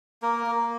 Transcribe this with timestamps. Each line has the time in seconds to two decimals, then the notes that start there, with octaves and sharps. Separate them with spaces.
0.22 A#3 A#4
0.46 A#3